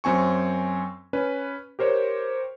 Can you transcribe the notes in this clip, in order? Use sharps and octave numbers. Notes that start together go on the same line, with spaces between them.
F#2 C4 G#5 C#6
C#4 B4
G4 A#4 C5 C#5